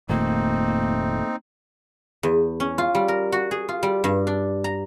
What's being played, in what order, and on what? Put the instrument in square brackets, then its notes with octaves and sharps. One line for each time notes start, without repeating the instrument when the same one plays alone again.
[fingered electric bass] F1 A#2 D#3 [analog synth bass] A3 [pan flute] A#3 [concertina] C4 D#4
[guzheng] E2
C#4
F4
G3
A#4
F#4
G#4
F4
G3
G2
D4
A#5